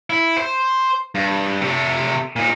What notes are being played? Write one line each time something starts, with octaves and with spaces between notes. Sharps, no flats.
E4
C5
G2
C3 A3
A#2 D#4